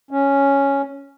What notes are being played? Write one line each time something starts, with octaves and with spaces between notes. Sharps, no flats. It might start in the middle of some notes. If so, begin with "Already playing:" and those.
C#4